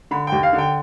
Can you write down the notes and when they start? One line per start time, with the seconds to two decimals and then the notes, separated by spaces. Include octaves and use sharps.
0.11 D3 B5
0.27 G5
0.32 D#2
0.43 F5
0.53 D3
0.58 G5